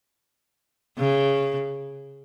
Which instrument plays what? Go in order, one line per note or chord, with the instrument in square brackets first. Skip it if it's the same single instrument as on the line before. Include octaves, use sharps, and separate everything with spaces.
[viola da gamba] C#3